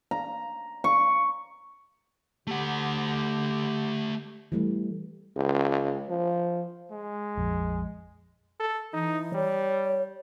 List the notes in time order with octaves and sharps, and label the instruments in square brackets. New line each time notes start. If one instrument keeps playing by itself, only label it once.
[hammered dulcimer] A#5
C#6
[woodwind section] D3 G4 [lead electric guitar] A3 F#5
[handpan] E3 G3 A3
[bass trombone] C#2
F3
[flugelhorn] G#3
[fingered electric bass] A#1 F2
[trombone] A4
[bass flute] E3 [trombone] D#4
[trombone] G3 [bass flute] C#5